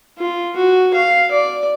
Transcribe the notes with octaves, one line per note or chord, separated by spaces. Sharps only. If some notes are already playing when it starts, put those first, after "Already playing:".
F4
F#4
F5
D5